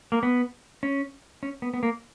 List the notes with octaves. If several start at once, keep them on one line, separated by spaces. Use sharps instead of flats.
A#3
B3
C#4
C#4
B3
B3
A#3